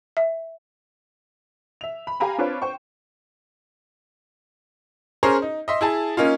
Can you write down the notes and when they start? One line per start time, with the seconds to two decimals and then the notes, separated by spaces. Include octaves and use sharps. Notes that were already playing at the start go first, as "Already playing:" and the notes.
0.17 E5
1.81 E5 F7
2.07 B5
2.20 G4 F5 G#5 A#5 B5
2.38 C4 D4 F4 B4 C#5
2.62 C5 G5 C#6
5.23 C#4 G#4 A#4 C5 C#5
5.42 D#4
5.68 D#5 E5 C6
5.81 E4 G#4 A5
6.17 A#3 C#4 D#4 F4